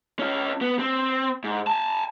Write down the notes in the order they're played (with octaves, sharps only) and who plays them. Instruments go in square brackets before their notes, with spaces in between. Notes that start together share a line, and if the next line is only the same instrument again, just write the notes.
[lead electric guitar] C#4 F4
B3
C4
G#2
G#5 A5